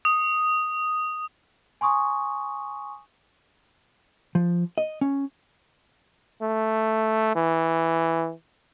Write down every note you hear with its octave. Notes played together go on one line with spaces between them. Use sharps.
D#6
G#5 C6 C#6 D#6
F3
D#5
C#4
A3
E3